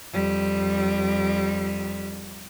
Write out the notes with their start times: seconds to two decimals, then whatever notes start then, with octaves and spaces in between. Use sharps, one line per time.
0.13 F2 G3